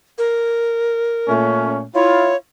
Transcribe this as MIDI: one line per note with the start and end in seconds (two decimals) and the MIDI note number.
0.18 1.33 70
1.28 1.84 46
1.28 1.84 57
1.28 1.84 61
1.95 2.34 64
1.95 2.34 65
1.95 2.36 73